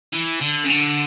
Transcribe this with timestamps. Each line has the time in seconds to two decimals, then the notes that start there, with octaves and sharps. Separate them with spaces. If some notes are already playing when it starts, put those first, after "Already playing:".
0.13 E3
0.41 D3
0.64 C#3
0.70 D3